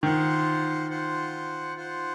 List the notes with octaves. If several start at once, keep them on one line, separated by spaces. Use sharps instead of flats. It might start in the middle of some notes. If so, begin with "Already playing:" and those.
D#3 F4 C5 F#5
F4 C5 F#5
F4 C5 F#5